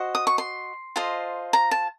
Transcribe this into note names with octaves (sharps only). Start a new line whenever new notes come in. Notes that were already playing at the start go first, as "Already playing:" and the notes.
Already playing: F#4 C5 D#5
D#6
C#6
C6
F4 A4 C5 D#5
A#5
A5